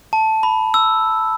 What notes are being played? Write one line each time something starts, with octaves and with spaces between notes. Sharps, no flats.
A5
B5
E6